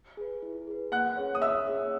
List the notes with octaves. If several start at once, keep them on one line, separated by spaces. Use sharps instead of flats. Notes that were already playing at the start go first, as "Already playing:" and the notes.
G#4 B4
E4
G#4 B4
A#3 F#5 F#6
C#4 G#4 C#5
D#6
A#3 E5 E6
C#4 G#4 C#5